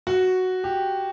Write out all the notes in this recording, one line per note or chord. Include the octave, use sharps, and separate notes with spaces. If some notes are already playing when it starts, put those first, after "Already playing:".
F#4
G4